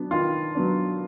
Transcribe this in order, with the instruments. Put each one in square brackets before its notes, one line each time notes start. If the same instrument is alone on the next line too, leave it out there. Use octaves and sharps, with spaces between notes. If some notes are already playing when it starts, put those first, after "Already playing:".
Already playing: [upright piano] F#3 B3 D4
D#3 F4
F#3 B3 D4